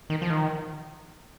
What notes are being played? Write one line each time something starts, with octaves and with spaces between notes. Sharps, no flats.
D#3
F3
D#3